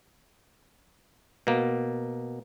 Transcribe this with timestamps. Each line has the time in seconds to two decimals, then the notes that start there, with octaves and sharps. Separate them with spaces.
1.47 B2 A#3